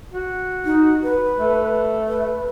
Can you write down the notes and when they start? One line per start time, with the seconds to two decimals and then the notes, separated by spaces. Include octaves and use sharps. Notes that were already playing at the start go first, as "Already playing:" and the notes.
0.13 F#4
0.65 D#4
1.03 B4
1.38 A3
2.08 B4